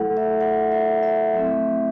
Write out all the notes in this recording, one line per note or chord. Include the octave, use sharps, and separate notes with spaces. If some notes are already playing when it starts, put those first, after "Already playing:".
Already playing: F#3 A3 E4 A4 F#5
E5
F#5
E5
E5
F#3 A3 C4 E4